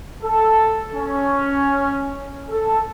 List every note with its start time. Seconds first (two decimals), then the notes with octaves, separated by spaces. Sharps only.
0.22 A4
0.95 C#4
2.50 A4